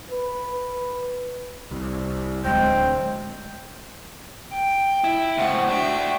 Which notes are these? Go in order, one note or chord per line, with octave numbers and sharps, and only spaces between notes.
B4
C2
D1 G#3 C4 G5
G5
E4
C#2 A2 C4 F#5
D4 F#4 E5 G5